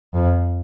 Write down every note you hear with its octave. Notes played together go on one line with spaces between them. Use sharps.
F2